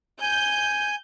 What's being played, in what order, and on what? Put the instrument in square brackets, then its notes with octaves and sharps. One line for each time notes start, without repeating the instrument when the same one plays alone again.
[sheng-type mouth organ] G#5 [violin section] G6